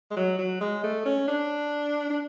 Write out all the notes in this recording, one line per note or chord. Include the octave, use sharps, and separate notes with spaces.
G#3
F#3
F#3
G#3
A3
C#4
D4
D4